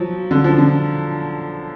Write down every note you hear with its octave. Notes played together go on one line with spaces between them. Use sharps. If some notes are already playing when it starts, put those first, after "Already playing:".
Already playing: F3 F#3
D3
F3
D3